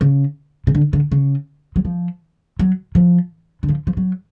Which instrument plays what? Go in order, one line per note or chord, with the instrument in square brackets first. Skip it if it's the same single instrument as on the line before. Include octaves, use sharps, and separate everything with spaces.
[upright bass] C#3
C#3
D3
D3
C#3
F#3
F3
F#3
F3
D3
F3
F3
F#3